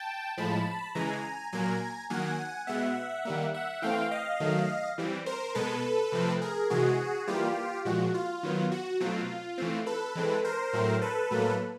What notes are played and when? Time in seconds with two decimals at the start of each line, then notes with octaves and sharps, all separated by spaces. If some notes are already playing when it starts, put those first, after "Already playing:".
Already playing: G5 A5
0.37 A2 F3 G#3 A5 B5
0.95 C#3 E3 G#3 G#5 A#5
1.52 A#2 F#3 A#3 G#5 A#5
2.10 D#3 F#3 A#3 F#5 G#5
2.67 B2 G#3 B3 E5 F#5
3.25 D#3 G3 A#3
3.54 E5 F#5
3.82 E3 A3 C4 F5 G5
4.11 D#5 F5
4.40 D#3 F#3 A3
4.98 E3 G3 C4
5.26 A#4 C5
5.55 B2 G#3 B3 A4 B4
6.12 C3 F3 A3 C4
6.42 G#4 A#4
6.70 C3 E3 G#3 F#4 G#4
7.27 E3 G3 A#3 F4 G4
7.85 A#2 F3 G#3 F#4
8.14 F4
8.43 D#3 F#3 B3
8.71 F#4
9.00 B2 F#3 A3 C4 F4
9.58 E3 A3 C4
9.86 A4 B4
10.15 E3 G#3 C4
10.44 A#4 C5
10.73 A2 F#3 A3 C4
11.01 A4 B4
11.31 A2 F#3 A#3